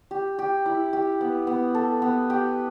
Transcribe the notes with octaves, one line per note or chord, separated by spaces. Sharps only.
G4
G4
E4
G4
B3
B3
A4
B3
G4